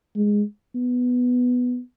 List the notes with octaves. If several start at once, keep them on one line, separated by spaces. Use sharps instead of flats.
G#3
B3